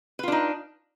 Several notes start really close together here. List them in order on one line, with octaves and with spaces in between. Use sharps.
B4 F4 D4 D#4